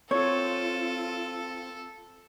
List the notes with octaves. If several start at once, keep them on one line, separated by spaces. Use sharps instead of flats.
C4 F4 A4 C#5